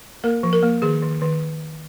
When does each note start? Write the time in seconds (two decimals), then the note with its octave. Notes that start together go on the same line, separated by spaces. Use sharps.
0.24 A#3 A#4
0.43 F3
0.53 A#4
0.63 A#3
0.82 D#3 G#4
1.02 D#3
1.21 D#3